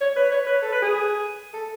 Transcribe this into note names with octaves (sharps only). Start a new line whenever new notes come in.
C#5
B4
C#5
B4
A4
B4
G#4
A4